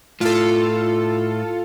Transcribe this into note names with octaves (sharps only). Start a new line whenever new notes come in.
A2 F4 A4